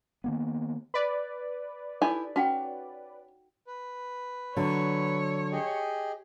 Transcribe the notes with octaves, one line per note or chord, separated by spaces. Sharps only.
D#3 A#3 B3
B4 D5
D#4 E4 G4 A4 G#5
C#4 F#4 F#5 G5
B4
D3 F#3 C#5
G4 G#4 D#5